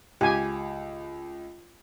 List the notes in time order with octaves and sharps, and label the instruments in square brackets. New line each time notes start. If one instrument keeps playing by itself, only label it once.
[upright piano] C#2 [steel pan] G4 G#5